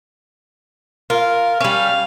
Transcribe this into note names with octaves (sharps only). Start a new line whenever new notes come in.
F4 A#4
G3 C#4 F5